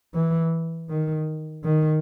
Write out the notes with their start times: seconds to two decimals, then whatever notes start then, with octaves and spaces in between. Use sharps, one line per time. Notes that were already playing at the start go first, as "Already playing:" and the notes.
0.15 E3
0.90 D#3
1.64 D#3